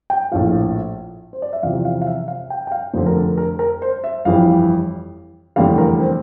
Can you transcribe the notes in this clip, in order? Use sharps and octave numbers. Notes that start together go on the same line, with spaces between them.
G5
A#1 A2 F3 F5
C5
D5
E5
E2 C3 F3 F5
F5
F5
E5
F5
G5
G5
F5
F1 F2 D3 C5
A#4
A4
A#4
A#4
C5
E5
G1 F2 E3 G3 F5
F1 E2 D3 G3 F5
A#4
C4